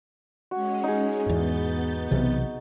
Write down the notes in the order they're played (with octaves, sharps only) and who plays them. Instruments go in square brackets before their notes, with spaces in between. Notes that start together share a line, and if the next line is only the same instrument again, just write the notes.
[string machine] G#3 C#4 [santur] F#4
[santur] D#4 G#4
[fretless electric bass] E2 G#2 [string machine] B3 G6 A6
[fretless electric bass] B1 C3 E3